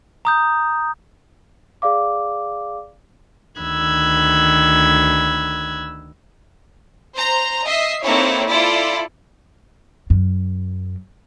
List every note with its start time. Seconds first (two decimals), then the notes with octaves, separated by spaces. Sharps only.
0.25 A#5 D#6 G6
1.82 G#4 D5 F5 D6
3.60 D2 D#3 B5 E6 F#6 G#6
7.16 C5 A#5
7.67 D#5 E5 C7
8.04 A#3 C4 D#4 E4 A4 C#5
8.48 E4 F4 A4 D5
10.10 F#2